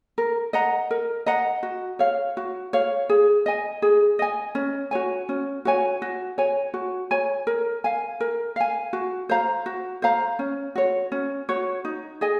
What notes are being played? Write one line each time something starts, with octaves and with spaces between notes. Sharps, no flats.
A#4
D#5 F#5 A#5
A#4
D#5 F#5 A#5
F#4
C#5 F5
F#4
C#5 F5
G#4
D#5 G#5
G#4
D#5 G#5
C#4
F#4 C#5 G#5
C#4
F#4 C#5 G#5
F#4
C#5 G#5
F#4
C#5 G#5
A#4
F5 G#5
A#4
F5 G#5
F#4
C5 F5 A#5
F#4
C5 F5 A#5
C#4
F#4 C#5
C#4
F#4 C#5
D#4
G#4 D#5 G#5